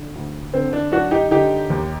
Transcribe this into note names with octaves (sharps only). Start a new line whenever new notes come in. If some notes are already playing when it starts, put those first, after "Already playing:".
Already playing: D3
D2
D3 C4
D4
F#2 D4 F#4
D#4 G4
D3 D#4 G4
D#2